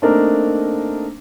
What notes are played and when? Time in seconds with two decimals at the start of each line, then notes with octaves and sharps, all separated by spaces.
0.02 A3 A#3 C4 D4 D#4 A#4